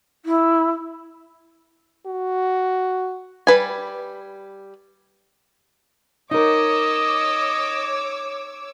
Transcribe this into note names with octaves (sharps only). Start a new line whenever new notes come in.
E4
F#4
G3 B4 G#5
D#4 A#4 C#5 D#5 D6 E6